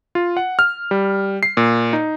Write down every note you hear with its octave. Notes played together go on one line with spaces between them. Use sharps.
F4
F#5
F6
G3
C7
A#2
D#4